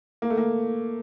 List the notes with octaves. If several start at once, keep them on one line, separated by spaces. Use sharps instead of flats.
A#3
A3
A#3